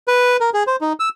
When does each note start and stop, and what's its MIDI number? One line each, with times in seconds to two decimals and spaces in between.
0.08 0.37 71
0.41 0.50 70
0.54 0.63 68
0.67 0.76 72
0.81 0.93 63
1.00 1.09 88